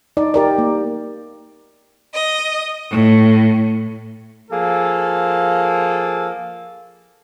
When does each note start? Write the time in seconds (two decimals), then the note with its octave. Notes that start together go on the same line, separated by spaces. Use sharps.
0.17 D#4 D5
0.34 G4 A#4 D5
0.58 A#3
2.15 D#5
2.92 A2
4.51 F3 A#3 G#4 A4